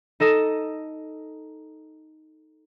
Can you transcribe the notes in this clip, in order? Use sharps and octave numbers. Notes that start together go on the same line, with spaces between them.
D#4 A4 D#5 E7